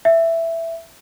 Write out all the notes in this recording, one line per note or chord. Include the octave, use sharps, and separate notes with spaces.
E5